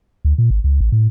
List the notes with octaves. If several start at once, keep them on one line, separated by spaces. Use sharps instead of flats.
D2
A#2
G#1
C#2
A1
A2